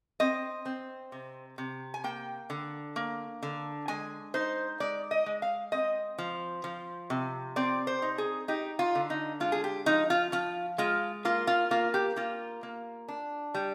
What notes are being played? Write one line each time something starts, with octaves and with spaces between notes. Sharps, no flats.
C4 D#5
C4
C3
C3
G#5
A#3 G5
D3
A#3
D3
G#3 G#5
D#4 C5
G#3 D5
D#5
G#3
F5
C4 D#5
F3
F3
C3
C4 D5
C5
D#4
G#4
D#4 G4
F4
D3
D#4
G#3 F4
G#4
G4
F3 D#4
F4
F3 F4
G#3 F4
A#3 F4
F4
A#3 F4
G4
A#3 F4
A#3
D4
G3